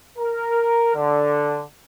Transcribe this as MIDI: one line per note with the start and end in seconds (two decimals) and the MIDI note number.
0.18 0.91 70
0.95 1.61 50